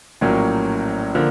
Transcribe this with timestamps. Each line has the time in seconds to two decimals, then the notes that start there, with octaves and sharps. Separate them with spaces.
0.21 A#1 A2 F#3 A#3 C#4
1.15 D3 F3 A#3